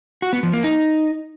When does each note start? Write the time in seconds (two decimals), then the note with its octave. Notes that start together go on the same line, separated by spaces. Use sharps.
0.22 F#4
0.33 B3
0.43 F3
0.53 A#3
0.64 D#4